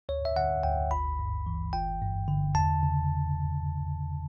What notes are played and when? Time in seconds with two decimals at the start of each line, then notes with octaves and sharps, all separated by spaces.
0.09 D2 C#5
0.25 E5
0.36 D3 F#5
0.63 D2 G5
0.91 G1 B5
1.19 G2
1.46 E3
1.73 G1 G5
2.01 G2
2.28 D3
2.55 E2 A5
2.83 C#3